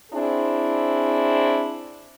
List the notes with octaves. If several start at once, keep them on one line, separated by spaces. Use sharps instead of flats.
C4 D4 E4 G#4